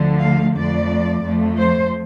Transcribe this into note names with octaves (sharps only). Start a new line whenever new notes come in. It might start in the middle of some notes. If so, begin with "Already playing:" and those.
Already playing: D2 D3 F3 A3
F5
F2 F3 A3 D5
F2 F3 A3
C5